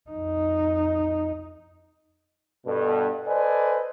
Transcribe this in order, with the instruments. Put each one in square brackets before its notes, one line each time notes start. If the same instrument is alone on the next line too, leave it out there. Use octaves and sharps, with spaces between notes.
[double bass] F2 D#4
[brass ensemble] G2 B2 A4
A4 B4 C5 D5 D#5 G#5